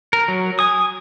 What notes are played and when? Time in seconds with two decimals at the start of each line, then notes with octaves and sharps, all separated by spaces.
0.13 A#4
0.28 F#3
0.59 G#5 D#6